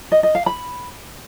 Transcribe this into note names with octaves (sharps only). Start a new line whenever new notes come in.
D#5
D#5
F5
B5